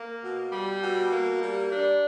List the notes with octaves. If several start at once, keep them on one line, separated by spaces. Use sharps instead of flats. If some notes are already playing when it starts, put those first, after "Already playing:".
Already playing: A#3
B2
G3
B2
A#3
G3
D4